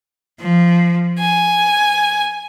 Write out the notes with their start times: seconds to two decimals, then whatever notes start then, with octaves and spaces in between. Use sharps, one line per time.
0.40 F3
1.16 G#5